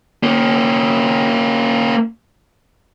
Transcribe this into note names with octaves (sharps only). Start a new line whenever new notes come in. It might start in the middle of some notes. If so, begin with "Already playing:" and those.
A#3 C#4